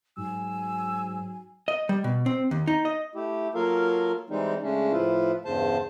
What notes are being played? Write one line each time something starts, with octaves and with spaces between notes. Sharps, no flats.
G#2 F#3 G#5 E6
D#5
G3
B2
C4
D#2
D#4
D#5
A3 E4 G4
F#3 A#3 F4 A4 A#4 F5
E3 G3 G#3 C4 D#4
C#3 G#3 A3 C#4 D4
A2 F3 E4 F4 B4
E2 G2 C#3 C5 A5